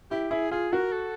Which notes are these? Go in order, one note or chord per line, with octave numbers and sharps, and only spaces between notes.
E4 G4
E4 G#4
F4 G#4
F#4 A#4
A4